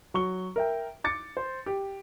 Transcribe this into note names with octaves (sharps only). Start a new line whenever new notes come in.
F#3 C#6 G7
A#4 E5 G5
D6 A6 C#7
C5
G4